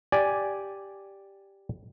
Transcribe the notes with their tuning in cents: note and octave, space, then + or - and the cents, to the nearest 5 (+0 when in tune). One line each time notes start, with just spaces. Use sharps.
G4 +0 D5 +0 G#5 +0